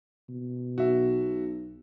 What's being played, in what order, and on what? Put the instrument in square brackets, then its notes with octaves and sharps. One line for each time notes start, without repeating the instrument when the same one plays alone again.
[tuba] B2
[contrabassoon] B1 [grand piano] F#4 E5